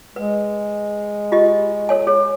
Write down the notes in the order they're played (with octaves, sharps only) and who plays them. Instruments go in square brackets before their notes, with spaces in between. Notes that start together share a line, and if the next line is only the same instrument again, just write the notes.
[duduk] G#3 [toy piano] B4
[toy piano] F4 G4 D#5
A4 C#5 G#5
G#4 C#5